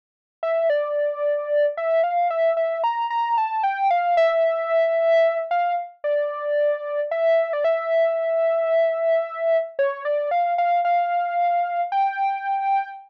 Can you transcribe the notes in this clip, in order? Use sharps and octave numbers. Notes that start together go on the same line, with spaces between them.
E5
D5
E5
F5
E5
E5
A#5
A#5
A5
G5
F5
E5
F5
D5
E5
D5
E5
C#5
D5
F5
F5
F5
G5